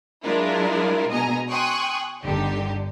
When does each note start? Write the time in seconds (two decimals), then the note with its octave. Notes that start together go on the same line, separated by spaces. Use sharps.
0.24 F#3 G#3 D4 E4 F4 A#4
1.10 B2 D#5 G#5 A#5
1.48 G5 G#5 C6 C#6 D#6 F#6
2.24 G1 D3 D#4 G4